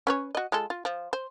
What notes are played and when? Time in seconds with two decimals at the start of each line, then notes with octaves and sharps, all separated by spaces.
0.07 C#4 B4 C#5
0.35 F#4 D#5
0.52 G#3 F4 A4
0.70 F4
0.85 F3
1.13 C5